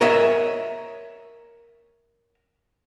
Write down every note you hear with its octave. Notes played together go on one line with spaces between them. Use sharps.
A#4 C#5 D#5 E5